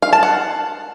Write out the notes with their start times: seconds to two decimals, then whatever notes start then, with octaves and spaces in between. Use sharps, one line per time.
0.02 F5
0.13 A5
0.23 F#5